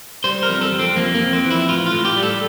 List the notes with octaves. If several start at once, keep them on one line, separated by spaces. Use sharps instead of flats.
G3 C5
A#4
F2
A4
F2
C4
F2 A#3
A#3
F2
C4
E3
E4
A2 F4
F4
A2
G4
G3
A4